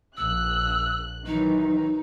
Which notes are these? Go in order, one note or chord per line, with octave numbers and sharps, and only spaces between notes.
A#1 E6 F#6
D#3 E3 F#3 D#4